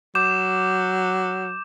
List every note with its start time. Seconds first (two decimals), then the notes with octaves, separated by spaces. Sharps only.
0.15 F#3 D6 G6 E7